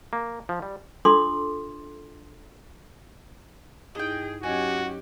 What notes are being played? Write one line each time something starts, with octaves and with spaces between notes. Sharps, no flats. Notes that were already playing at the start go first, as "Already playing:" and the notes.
A#3
F3
G3
D4 F4 A4 C6 D6
G2 D#4 E4 G#4 D#5 G5
F#3 C#4 F#4 G4 D#5 G#5